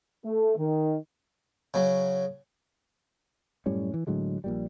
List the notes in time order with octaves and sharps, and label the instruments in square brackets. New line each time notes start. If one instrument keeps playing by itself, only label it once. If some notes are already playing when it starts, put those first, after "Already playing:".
[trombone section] A3
D#3
[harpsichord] C#3 F#3
[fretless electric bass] F#2 A2 G3 C#4
E3
A2 D3 F#3 G#3
A#1 A#2 G3